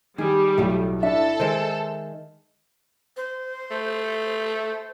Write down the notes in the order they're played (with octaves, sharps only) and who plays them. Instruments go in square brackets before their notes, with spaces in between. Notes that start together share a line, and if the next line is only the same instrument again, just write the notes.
[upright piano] D#3 [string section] G3 [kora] G#4
[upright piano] B1 [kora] A2 A3
[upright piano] D4 E4 [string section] A4 [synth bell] E5
[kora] D#3 G#3 [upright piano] C5
[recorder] C5
[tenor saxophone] A3